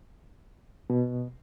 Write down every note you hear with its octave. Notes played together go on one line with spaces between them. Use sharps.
B2